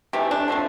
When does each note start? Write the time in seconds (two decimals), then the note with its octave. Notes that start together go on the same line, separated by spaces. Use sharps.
0.13 C3 E3 A3 G4
0.31 D4
0.48 D3 F3 A3 C4